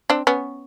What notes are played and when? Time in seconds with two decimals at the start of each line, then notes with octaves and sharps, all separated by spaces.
0.10 C4 D4
0.27 B3 C#4